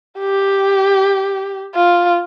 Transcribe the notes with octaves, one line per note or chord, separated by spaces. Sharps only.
G4
F4